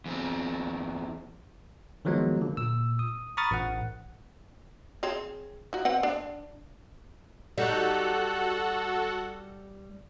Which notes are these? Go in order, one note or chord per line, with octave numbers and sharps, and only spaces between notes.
E2 C4
D#3 F3 F#3 G#3 B3
D3 A#3
A#2 E6
D#6
A#5 B5 C#6 D#6 F6 A6
A1 F#5
C4 G#4 C#5
D#4 F#4
C4 B4 F#5
D4
G3 D#4 F#4 A4 F#5